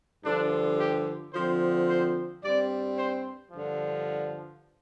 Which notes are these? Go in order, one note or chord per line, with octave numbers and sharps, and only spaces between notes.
G2 D3 F3 D4
G4
D3 F3 C4 C5
C5
G2 G3 C4 D5
C5
G2 D3 F3